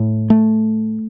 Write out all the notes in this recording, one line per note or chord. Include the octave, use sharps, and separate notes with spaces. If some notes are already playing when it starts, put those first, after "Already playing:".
Already playing: A2
A3